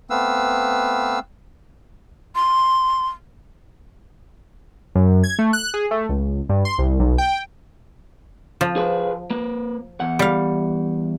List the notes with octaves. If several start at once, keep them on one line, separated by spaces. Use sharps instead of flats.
A3 B3 C4 B4 F5 E6
C6
F#2
G#6
A3
F#6
G#4
A3
C#2
G2
C6
C2
B1
G5
F3
G#4 B4 C5
A#3 B4
E2 F#5
G3 F5